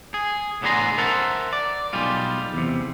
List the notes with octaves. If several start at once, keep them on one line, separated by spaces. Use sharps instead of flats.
G#4
A2 D3 B3 G#4 A#5 C6
A#4 C5 E5 F#5 A5
D5
B1 G3 G#3 F4
E2 C3